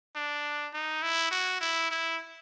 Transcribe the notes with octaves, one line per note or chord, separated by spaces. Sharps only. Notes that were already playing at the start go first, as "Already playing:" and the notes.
D4
D#4
E4
F#4
E4
E4